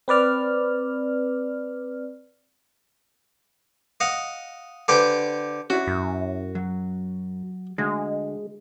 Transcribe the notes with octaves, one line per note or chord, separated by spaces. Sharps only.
C4 B4 D5 F6
D#5 F5 F#5
D3 G4 B4 C5 G5
C#4 E4 F#4 D5
F#2
F#3
D2 D3 G#3